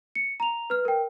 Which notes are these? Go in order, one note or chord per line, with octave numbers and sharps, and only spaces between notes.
C#7
A#5 F7
B4 F6
A#4 G5